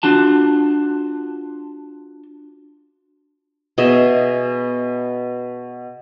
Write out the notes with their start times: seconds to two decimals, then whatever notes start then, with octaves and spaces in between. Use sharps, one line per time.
0.03 D4 F4 F#4 A5
3.78 B2 G#4 D#5 E5